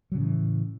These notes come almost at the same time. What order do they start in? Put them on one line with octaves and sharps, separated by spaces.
F#3 C#3 A2 E3